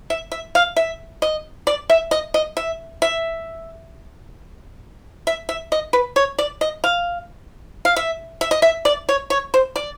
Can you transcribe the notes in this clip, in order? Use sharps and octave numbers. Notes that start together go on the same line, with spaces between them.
E5
E5
F5
E5
D#5
D5
E5
D#5
D#5
E5
E5
E5
E5
D#5
B4
C#5
D5
D#5
F5
F5
E5
E5
D#5
E5
D5
C#5
C#5
C5
D5